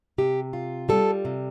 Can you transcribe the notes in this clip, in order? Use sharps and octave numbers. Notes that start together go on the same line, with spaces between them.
C3 G4
F4
G3 A4
C3